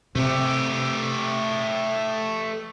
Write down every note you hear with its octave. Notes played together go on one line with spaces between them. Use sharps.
C3 A3 G4